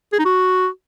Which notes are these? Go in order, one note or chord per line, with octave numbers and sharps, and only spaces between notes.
G#4
D#4
F#4